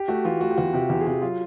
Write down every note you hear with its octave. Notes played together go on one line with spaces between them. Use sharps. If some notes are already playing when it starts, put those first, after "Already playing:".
Already playing: G4
A3 F#4
E3 F4
A3 F#4
G4
E2 F#4
C3 G4
E2 G4
G#4
C3 G4
F#3 F4